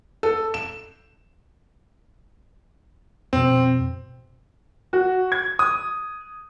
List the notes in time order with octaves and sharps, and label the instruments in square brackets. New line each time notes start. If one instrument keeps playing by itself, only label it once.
[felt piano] A4
E7
[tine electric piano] F2 B2 [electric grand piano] C4
[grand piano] F#4
G#6
D#6